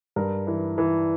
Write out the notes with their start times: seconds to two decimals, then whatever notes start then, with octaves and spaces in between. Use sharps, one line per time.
0.16 G2 A#4
0.47 E3
0.78 E3